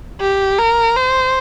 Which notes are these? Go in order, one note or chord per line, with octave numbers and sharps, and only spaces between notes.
G4
A#4
C5